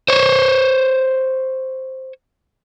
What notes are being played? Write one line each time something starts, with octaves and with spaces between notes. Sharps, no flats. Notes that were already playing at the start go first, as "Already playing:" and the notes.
C5 C#5